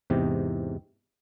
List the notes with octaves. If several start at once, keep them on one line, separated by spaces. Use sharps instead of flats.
E2 G#2 C3 G4